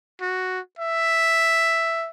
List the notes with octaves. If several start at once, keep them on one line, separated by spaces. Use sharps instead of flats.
F#4
E5